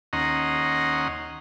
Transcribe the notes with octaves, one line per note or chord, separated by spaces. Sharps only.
D#2 C#4 D#5 F#5 A#5 C6